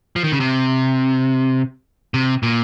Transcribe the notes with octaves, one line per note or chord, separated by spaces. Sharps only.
F3
D#3
C#3
C3
C3
A#2